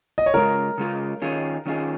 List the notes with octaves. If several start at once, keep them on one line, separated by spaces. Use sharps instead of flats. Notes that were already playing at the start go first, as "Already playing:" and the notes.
D#5
C#5
C#3 G#3 F4 A#4
C#3 G#3 F4
D#3 C#4 F4 G#4
D#3 C#4 F4 G#4